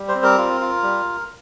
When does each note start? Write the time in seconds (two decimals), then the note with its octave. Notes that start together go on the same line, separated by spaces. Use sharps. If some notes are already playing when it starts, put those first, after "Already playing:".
Already playing: G3
0.08 C5
0.15 C4
0.23 A#4
0.38 F4
0.61 F4
0.83 G3